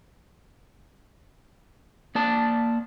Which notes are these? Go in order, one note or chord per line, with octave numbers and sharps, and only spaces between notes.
A#3 D5 A5